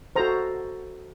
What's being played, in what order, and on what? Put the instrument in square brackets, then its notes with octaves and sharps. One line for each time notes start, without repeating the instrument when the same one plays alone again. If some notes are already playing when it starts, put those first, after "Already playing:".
[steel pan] F#4 A4 C5 A#5